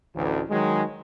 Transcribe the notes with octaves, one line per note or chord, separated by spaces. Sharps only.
A1 D2
D#3 F#3 G#3